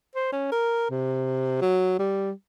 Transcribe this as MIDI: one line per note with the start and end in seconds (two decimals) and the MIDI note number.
0.15 0.29 72
0.32 0.52 61
0.52 0.89 70
0.91 1.59 48
1.62 1.96 54
1.99 2.31 55